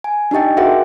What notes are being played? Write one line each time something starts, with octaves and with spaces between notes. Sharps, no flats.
G#5
D4 D#4 G4 D#5 G5
F#4 G#4 A#4 E5 F#5 G5